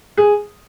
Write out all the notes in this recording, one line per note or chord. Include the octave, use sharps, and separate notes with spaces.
G#4